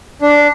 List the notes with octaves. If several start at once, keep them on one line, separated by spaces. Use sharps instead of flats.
D4